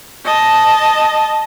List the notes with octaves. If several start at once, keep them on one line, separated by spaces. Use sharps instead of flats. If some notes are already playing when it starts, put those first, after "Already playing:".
D#5 A5